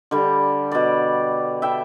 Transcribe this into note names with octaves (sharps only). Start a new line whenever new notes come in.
D3 G3
B2 D5
E5 G5